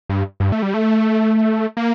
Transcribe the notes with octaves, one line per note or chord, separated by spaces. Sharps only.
G2
G2
A3
G3
A3
A#3